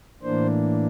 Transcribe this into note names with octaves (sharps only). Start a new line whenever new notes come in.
A2 E3 A#3 D4 C5